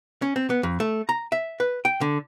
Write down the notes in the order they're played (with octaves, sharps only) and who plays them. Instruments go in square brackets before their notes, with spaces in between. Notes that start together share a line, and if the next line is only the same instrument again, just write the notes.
[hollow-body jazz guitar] C#4
C4
B3
F2
A3
A#5
E5
B4
G5
D3